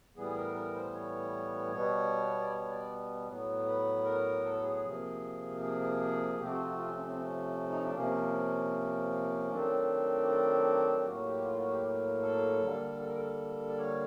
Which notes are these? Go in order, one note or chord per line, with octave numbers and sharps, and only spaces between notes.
A2 E3 G3 B3 G#4
A#4
A#4
C5
C#5
B2 G3 B3 C#5
D5
C#5
D5
A2 F#3 B3
B4
A#4
A4
G#4
C3 F3 A#3
G#4
G#4
C3 F3 A3 C4 G4
F#4
F4
F#4
F4
C#4
C#4
C4
C#4
D#4
D4
C3 F3 A#3 C#4
D#3 F#3 A3 C4 D4
D4
G4
A2 F#3 A#3 F#4
G4
F#4
F4
F#4
G4
A4
D3 G3 A#3
A4
A#4
A4
D5
C#5